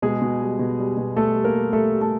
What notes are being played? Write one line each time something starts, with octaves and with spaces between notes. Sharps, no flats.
B2 G#3 G#4
B2
G3
B2
G3
B2
G3 A3 A4
G3
A#3 A#4
G3
G3 A3 A4
G3
A3 A4